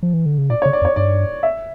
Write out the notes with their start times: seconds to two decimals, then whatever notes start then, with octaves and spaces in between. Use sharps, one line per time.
0.03 F3
0.13 E3
0.26 D3
0.38 C#3
0.50 A#2 D5
0.62 C#5
0.66 C#3
0.73 D5
0.82 F2
0.85 C#5
0.96 G2 D5
1.43 E5